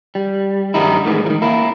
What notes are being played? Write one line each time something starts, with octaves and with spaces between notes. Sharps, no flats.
G3
G2 D#3 F#3 G3 D#4 E4
A2 D#3 E3 G#3
D#3 F3
A#3 E4